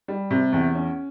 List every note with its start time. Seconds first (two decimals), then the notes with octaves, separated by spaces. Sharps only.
0.08 G3
0.31 C3
0.53 E2
0.75 C#4